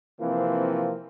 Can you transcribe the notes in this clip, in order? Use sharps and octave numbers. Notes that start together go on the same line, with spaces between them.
C3 E3 F3 A#3 C4